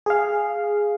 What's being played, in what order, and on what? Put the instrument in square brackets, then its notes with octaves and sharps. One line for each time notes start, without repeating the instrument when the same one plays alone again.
[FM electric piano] G#4 F5